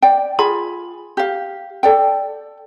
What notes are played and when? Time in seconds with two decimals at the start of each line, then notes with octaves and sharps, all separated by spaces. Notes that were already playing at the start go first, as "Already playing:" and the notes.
0.02 D5 G5
0.39 F4 G#4 B5
1.17 G4 F5
1.83 A4 D5 G5